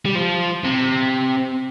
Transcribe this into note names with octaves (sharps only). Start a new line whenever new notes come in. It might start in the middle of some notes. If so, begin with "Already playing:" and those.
G3
F3
C3